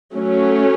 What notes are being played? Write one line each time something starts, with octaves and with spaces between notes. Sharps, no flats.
F#3 A3 C#4